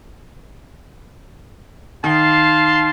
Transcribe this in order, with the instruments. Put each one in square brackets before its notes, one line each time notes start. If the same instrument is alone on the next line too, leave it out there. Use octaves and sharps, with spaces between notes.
[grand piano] D#3 [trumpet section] F5 A5 C6